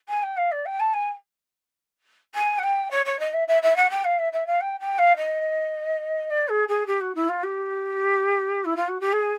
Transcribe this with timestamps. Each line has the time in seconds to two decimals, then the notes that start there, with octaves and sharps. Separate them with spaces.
0.08 G#5
0.22 G5
0.37 F5
0.51 D5
0.65 G5
0.79 A5
0.93 G#5
2.34 G#5
2.58 F#5
2.63 G5
2.90 C#5
3.05 C#5
3.19 D#5
3.33 E5
3.47 E5
3.62 E5
3.76 F#5
3.90 G5
4.04 F5
4.18 E5
4.32 E5
4.46 F5
4.60 G5
4.80 G5
4.98 F5
5.16 D#5
6.30 D5
6.48 G#4
6.68 G#4
6.86 G4
7.00 F#4
7.15 E4
7.28 F4
7.43 G4
8.64 E4
8.76 F4
8.88 F#4
9.00 G4
9.12 G#4